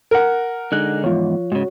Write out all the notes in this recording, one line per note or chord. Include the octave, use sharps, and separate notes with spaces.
A#4 F#5
D3 G#3 D#4 F#6
E2 G#2 F3 F4 C#5
G#2 C#3 F#4 C#5